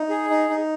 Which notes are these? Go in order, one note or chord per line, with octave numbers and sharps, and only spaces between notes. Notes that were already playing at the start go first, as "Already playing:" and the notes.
Already playing: D#4
G#4
D#4
D#4